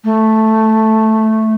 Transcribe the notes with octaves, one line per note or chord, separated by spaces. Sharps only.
A3